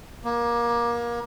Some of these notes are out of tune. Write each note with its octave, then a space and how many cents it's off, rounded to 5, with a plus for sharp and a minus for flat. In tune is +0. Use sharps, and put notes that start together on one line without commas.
A#3 +25